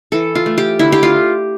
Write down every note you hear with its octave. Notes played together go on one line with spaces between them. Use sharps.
E3 A4
F4
A3
G4
D3 E4
G4
F4